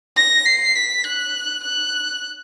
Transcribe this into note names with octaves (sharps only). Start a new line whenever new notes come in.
A#6
C7
B6
F#6
F#6